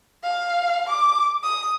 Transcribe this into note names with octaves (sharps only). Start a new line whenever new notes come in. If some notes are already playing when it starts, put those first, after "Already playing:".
F5
D6
D#6